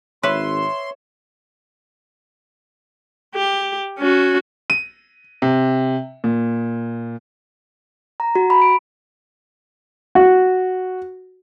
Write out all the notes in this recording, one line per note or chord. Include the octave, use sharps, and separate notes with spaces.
G#1 B4 C#5 E5 C6
G4
C#4 F#4
D#7
C3
A#2
A#5
F#4
B5
D7
F#4